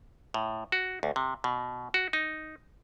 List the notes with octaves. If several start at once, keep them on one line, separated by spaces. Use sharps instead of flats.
A2
F#4
D2
C3
B2
F#4
D#4